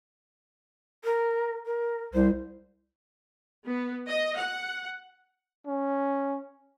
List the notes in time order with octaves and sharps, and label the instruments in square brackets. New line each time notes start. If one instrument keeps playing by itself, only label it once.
[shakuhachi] A#4
A#4
[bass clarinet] C2 [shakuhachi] C5
[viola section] B3
D#5
F#5
[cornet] C#4